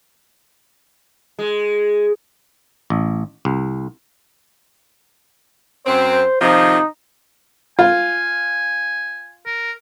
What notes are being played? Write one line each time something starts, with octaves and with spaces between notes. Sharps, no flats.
G#3
A1
C2
F#2 C4 C5
C3 D#3 F3 D#4
F4 G#5
A#4